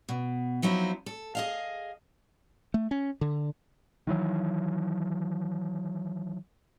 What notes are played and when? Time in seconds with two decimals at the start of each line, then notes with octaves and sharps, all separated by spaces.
0.09 B2
0.62 F3 F#3 C4 D#4 E4
1.06 A4
1.35 G#4 D#5 F5
2.74 A3
2.91 C#4
3.21 D3
4.07 D#3 E3 F#3